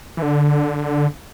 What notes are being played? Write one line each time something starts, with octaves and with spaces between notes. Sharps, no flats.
E3
D3